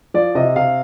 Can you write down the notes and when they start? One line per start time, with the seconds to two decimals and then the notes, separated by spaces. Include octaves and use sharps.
0.14 F3 D5
0.35 C3 D#5
0.56 C3 F5